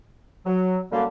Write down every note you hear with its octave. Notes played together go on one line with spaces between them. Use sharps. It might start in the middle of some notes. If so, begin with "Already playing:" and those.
F#3
F#2 D3 G3 A#3